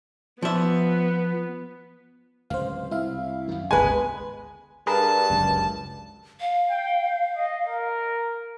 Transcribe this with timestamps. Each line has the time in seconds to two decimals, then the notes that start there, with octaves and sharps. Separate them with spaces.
0.42 F3 B3 E5
2.50 D1 C#2 C5 F5
2.91 C2 E4 E5 F5
3.48 F#2 D#3
3.71 G#1 D2 C#3 G#3 B3 B4 G#5 A#5
4.87 G2 G#4 A#4 B4 A5
5.30 G1 C#2 F#2
6.41 F5
6.70 G5
7.36 D#5
7.67 A#4